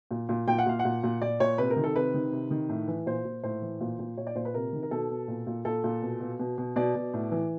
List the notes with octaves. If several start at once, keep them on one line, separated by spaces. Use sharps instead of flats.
A#2
A#2
A#2 G5
F#5
A#2 F5
F#5
A#2
A#2
A#2 D5
A#2 C#5
C3 B4
A#4
D#3
A4
C3 B4
D#3
C3
D#3
A2
E3
A#2 C5
A#2
A2 C5
E3
A#2
A#2
A#2 C#5
D5
A#2 C5
B4
C3 A#4
D#3
A#4
B2 A4
B2
A#2
A#2
A#2 A4
A#2
B2
B2
B2
B2
B2 D5
B2
A2
E3